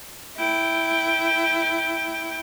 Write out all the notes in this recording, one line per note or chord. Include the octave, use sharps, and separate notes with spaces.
E4 G5